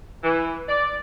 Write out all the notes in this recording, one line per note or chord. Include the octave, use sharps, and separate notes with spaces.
E3
D5